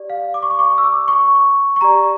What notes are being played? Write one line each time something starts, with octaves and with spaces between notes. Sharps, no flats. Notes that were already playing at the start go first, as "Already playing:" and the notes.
Already playing: G4 D5
F5
D6
C#6
D6
C#6
E6
D6
C#6
C#6
G4 D5 A#5